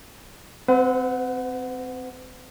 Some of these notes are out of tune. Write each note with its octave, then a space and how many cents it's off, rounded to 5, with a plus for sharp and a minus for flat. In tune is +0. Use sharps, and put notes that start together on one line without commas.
C4 -15 B4 +45 F#5 -10